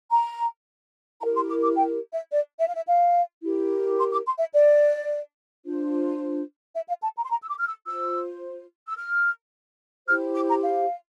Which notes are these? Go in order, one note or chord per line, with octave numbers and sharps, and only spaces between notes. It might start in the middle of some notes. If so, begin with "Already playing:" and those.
A#5
E4 G4 A#4 A#5
C6
D6
D6
G5
E5
D5
E5
F5
E5
F5
E4 G4 A#4
C6
D6
C6
E5
D5
D4 F4 C5
E5
F5
A5
A#5
C6
A#5
E6
D6
F6
E6
F4 C5 E6
E6
F6
E4 G4 C5 F6
D6
A#5
F5